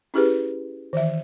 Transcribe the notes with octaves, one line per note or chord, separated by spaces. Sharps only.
C#4 E4 G4 G#4 B4
D#3 E3 E5